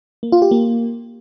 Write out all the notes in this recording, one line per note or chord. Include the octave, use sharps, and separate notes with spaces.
A#3
F4
G4
A#3